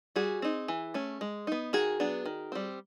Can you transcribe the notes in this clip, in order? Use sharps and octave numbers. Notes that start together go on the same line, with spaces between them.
G3 F#4 G#4
C4 D#4
E3
A3 C#4
G#3
B3 D#4
D#3 F#4 G#4
F#3 B3 D4
D#3
G3 C4